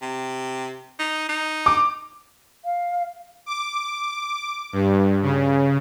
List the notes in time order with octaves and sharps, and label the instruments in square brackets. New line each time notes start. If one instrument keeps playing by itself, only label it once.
[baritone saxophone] C3
D#4
D#4
[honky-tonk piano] D6
[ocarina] F5
[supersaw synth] D6
G2
C#3